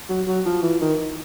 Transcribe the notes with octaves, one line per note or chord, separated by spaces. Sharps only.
F#3
F#3
F3
E3
D#3